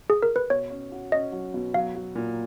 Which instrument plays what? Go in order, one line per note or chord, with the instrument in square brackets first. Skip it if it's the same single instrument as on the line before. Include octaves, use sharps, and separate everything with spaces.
[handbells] G#4
A#4
B4
[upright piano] B2 [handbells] C#5
[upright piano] C#4
F#4
[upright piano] C#4 [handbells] D#5
[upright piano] F#3
B2
[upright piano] F#3 [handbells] F5
[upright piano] F#3
A#2